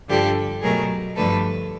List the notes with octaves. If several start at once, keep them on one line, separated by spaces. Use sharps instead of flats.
G2 D3 F3 G4 A4
B2 F#3 A3 G#4 A#4
G2 D3 F3 A3 A4 B4